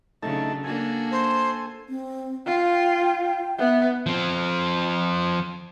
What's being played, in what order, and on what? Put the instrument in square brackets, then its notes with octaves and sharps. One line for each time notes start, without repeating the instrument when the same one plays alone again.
[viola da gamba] C#3 F#3 D4 [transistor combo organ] A3 D#4 A5
[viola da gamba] A#3 D4 F#4 [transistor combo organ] A4 G#5
[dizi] C5
[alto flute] C4
[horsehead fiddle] F4 [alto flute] G5
[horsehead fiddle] B3 [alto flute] E5
[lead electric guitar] F3 C4